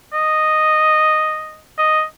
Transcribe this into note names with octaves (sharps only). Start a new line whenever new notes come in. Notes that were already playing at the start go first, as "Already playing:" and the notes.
D#5
D#5